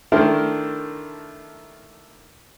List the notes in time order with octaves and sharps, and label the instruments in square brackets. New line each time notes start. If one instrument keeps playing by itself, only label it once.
[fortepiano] D#3 A3 D4 E4 A#4 C5